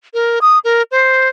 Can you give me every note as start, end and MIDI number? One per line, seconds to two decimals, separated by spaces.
0.14 0.39 70
0.41 0.59 87
0.64 0.82 70
0.91 1.29 72